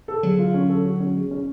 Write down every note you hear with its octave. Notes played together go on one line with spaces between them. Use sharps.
A4
D3 F#3 G#3
F4
C#4
A4
F#4
C#4
G#3
C#4